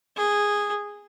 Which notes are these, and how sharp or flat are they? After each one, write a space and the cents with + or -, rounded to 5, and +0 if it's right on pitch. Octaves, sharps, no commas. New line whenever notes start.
G#4 -10